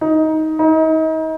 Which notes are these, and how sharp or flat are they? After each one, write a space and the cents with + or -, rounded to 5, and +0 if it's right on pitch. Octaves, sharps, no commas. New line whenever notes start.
D#4 +15
D#4 +35